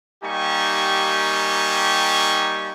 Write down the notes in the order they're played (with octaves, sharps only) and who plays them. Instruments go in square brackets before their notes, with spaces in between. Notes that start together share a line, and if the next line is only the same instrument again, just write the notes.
[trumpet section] G3 A#3 D#4 G4 G#5 C#6